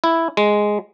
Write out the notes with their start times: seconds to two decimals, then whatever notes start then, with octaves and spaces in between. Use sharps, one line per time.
0.04 E4
0.37 G#3